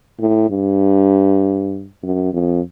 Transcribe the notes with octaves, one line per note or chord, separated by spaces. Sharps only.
A2
G2
F#2
F2